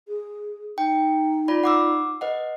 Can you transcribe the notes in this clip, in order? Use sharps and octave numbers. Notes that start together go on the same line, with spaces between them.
G#4
D#4 G5
F4 D5 B5
F#5 D6 E6
B4 D#5 F#5